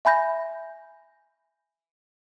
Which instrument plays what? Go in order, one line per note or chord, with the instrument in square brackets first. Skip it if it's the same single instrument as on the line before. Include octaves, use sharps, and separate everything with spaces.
[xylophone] E5 G#5 B5 G6 A#6